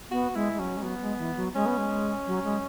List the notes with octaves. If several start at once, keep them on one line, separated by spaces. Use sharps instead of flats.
B3 F#4
G#3 E4
G#3
F#3 C#4
G#3
F#3 B3
G#3
E3
F#3
G#3 C#4
B3
G#3
F#3
G#3